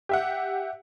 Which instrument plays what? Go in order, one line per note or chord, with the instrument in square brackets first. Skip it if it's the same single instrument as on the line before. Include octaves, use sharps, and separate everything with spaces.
[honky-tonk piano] G4 E5 F#5